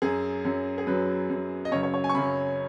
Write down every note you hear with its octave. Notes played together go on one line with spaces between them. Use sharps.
F#2 F#3 G#4
F#2 F#3
G#4
F#2 F#3 B4
F#2 F#3
D#5
F#2 C#3 F#3 C#5
C#5
C#5
G#5
C#6
F#2 C#3 F#3 B5